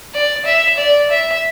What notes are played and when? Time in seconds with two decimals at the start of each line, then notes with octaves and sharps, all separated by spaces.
0.14 D5
0.46 E5
0.77 D5
1.10 E5